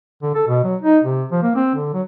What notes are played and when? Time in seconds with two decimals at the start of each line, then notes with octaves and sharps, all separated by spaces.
0.22 D3
0.35 A4
0.48 B2
0.64 F#3
0.82 D#4
1.04 C3
1.31 F3
1.43 A#3
1.55 C4
1.75 D3
1.93 F#3